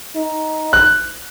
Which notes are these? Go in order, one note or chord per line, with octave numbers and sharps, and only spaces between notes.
D#4
F#6